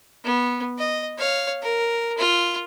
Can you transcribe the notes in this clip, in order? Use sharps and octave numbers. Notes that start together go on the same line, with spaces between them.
B3
D#5
C#5 F5
A#4
F4